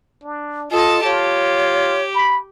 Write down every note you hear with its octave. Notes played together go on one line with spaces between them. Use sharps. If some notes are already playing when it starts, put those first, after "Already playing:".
D4
F4 A4 D#5 A5
F4 G4 C#5
B5